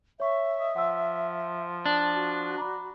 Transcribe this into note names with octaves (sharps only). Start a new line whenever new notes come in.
C#5 E5 C#6
D#5
F3 F#5 E6
D4
F#4
D5 A#5 B5